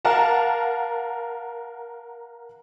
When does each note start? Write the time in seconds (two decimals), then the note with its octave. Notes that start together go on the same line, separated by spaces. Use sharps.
0.05 A#4 F5 F#5 A5 A#5